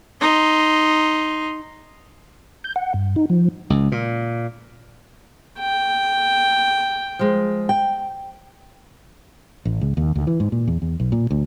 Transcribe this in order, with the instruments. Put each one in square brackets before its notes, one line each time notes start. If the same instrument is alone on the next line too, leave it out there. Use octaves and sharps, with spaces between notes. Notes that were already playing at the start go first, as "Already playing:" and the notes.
[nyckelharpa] D#4 C6
[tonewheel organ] G6
F#5
G2
D#4
F3
[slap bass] C#2
A#2
[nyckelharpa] G5
[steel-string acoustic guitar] F3 G#3
G5
[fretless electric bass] A1
C#2
D#2
D2
E3
G#2
A#2
E2
E2
B1
A#2
D2